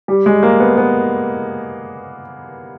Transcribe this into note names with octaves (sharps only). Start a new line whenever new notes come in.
G3
G#3
A#3
B3
B3